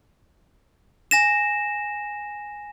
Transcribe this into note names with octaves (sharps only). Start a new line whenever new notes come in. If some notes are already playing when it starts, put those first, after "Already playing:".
G#5 A#6 E7